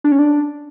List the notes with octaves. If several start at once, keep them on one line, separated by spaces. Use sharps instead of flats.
D4
C#4
D4